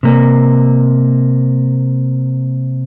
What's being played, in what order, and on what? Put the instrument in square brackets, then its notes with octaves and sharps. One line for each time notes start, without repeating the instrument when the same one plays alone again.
[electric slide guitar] C3 A#3